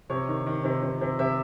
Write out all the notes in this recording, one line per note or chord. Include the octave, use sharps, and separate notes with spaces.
C3 C#5
D#3
D#3
C3
C3
C3
C3 E5